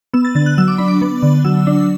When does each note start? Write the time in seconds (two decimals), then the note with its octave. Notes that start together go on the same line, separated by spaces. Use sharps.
0.13 B3 E6
0.25 A6
0.35 D3 A6
0.46 F#6
0.58 F#3 E6
0.68 D6
0.78 D4 B5
0.88 D6
1.01 B3
1.23 D3
1.45 F#3 E6
1.67 D4